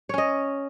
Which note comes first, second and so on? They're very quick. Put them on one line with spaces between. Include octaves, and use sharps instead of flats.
C#5 C#4 D#5